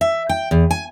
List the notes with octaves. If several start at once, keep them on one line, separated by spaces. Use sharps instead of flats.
E5
G5
E2
G#5